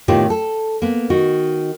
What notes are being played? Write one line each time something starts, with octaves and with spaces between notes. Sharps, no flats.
A2 C3 D#3 B3 F4 G4
A4
A#3 B3
D#3 F#4